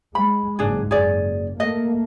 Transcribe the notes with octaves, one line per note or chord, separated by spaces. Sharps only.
G#3 B5
F#1 G#2 D4 G#4
F#1 G#4 D5
A3 A#3 D#5